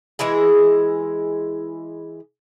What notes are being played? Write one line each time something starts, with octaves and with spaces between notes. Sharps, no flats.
E3 G#3 E4 G#4